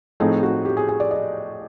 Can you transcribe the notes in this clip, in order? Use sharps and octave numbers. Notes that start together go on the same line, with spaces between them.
A2 F3 A3 C4 D#4 G#4
F#4
G4
G#4
G#4
D5
D#5